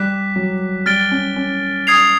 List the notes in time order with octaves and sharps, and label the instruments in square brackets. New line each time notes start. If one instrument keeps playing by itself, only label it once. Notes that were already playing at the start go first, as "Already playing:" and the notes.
Already playing: [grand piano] G3 [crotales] D6 F#6 B6
[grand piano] F#3
[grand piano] G3 [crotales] F6 A6 D7 G7
[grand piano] C#4
C#4
[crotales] D#6 G#6 C7 F7